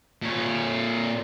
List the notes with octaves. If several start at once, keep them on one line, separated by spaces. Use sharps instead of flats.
A#2 C#5